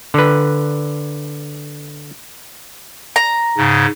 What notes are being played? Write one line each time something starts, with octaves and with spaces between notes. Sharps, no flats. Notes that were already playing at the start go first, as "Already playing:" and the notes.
D3 B4
A#5
G#2 C#3